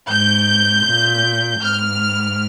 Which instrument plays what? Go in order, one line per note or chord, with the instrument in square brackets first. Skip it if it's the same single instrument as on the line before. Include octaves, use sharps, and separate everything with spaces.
[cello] G#2 [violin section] G6
[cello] A#2
[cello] G#2 [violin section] F6